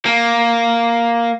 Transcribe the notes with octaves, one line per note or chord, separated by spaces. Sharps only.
A#3